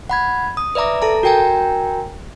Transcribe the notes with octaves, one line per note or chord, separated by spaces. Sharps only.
F#5 B5 G#6
D#6
B4 D5 E5 A#5 D6
A4 A5 A#5
F#4 A#4 G5 G#5 A#5